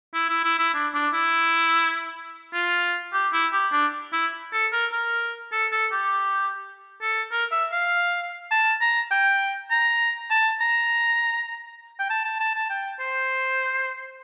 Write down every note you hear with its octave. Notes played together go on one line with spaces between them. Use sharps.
E4
E4
E4
E4
D4
D4
E4
F4
G4
E4
G4
D4
E4
A4
A#4
A#4
A4
A4
G4
A4
A#4
E5
F5
A5
A#5
G5
A#5
A5
A#5
G5
A5
A5
A5
A5
G5
C5